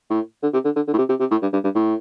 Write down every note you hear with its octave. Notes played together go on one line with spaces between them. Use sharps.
A2
D3
C3
D3
D3
D3
A2
C3
C3
C3
A2
G2
G2
G2
A2